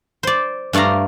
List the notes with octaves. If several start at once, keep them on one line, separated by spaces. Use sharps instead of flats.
C5 D5
G2 A3 D5 F5 A#5